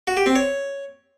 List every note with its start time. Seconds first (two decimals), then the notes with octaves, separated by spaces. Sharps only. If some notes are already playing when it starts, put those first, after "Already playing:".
0.07 F#4
0.17 G4
0.26 C4
0.36 C#5